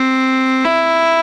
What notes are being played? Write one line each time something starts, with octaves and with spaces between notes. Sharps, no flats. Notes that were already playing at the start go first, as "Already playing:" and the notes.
Already playing: C4
E4